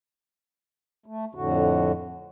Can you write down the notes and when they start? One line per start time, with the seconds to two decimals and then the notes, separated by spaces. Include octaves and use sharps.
1.06 A3
1.35 F2 A2 D3 F#4